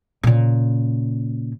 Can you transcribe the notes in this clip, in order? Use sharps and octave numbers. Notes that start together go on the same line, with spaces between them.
A#2 C#3